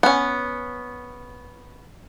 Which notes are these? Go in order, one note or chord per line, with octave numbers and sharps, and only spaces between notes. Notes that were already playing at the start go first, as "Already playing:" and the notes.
B3 C#4